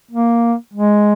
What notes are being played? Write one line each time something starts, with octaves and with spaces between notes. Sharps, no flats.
A#3
G#3